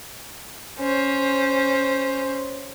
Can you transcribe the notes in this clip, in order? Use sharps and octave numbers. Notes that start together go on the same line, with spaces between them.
C#4 C5